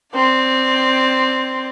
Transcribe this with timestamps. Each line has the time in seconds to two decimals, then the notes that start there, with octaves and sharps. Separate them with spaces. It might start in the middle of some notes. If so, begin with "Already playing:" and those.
0.15 C4 D5